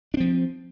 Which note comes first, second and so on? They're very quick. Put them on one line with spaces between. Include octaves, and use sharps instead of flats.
D4 C4 F3